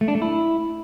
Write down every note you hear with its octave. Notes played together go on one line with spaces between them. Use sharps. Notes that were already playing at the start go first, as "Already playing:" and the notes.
A3
D4
A3
E4